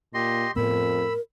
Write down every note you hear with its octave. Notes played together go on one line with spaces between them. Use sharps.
A#2 G4 D#5 C6
F2 A2 B3 A#4 B5 E6